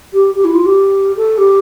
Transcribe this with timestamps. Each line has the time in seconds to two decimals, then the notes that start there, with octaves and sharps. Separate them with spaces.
0.13 G4
0.34 G4
0.44 E4
0.54 F4
0.66 G4
1.16 A4
1.38 G4